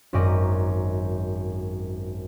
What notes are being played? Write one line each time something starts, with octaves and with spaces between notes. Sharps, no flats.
G#1 F#2 D5 D#5 A#5